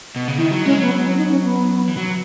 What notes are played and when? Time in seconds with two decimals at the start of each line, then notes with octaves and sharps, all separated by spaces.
0.16 B2
0.28 C#3
0.38 D#3 E4
0.51 F#3
0.65 G#3 C#4
0.78 F#3 B3
0.91 C#4
1.05 C#4
1.18 D#4
1.31 C#4
1.44 B3
1.88 E3
1.97 F#3